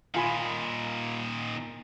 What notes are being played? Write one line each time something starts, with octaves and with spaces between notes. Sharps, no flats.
A#2 D#3 F4 G#5 B5